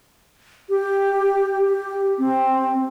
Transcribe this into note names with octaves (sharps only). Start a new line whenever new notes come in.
G4
G4
C4